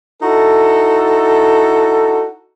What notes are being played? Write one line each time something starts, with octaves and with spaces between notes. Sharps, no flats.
D#4 E4 F#4 A4